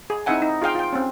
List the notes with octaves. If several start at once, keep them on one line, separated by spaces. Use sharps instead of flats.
G#4
C4 D#4 E4 E5 F#5 G#5
D#4
F4 G#4 F5 G5
F4 G5
C4 C#4